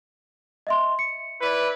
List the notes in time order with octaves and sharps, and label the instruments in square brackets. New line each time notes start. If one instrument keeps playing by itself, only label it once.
[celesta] D#5 E5 C6
C#7
[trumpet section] E4 B4 D5